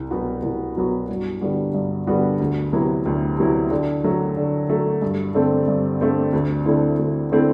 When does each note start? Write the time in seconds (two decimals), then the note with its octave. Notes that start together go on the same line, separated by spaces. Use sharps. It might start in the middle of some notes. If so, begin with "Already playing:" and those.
Already playing: C2
0.11 B2 F#3 B3 F#4
0.43 C2
0.76 B2 F#3 B3 F#4
1.10 G2
1.41 D3 G3 B3 F#4
1.74 G2
2.07 D3 G3 B3 F#4
2.40 D2
2.73 C3 F#3 B3 E4
3.06 D2
3.38 C3 F#3 B3 E4
3.71 D3
4.04 F#3 A3
4.37 D3
4.69 F#3 A3
5.02 G2
5.35 D3 A3 C4
5.68 G2
6.01 D3 A3 C4
6.33 D2
6.66 D3 A3 C4 E4
6.99 D2
7.32 D3 A3 C4 E4